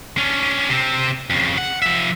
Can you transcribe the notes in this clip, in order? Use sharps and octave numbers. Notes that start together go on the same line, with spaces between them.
C#4 D4
C3 C4
F2 C#3
F#5
F3 E5